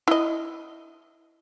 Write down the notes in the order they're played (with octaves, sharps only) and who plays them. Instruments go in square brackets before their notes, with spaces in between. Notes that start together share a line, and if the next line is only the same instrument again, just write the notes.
[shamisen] E4 D#5